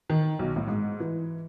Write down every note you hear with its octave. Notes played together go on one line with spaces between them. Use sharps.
D#3
B1
A2
G#2
E3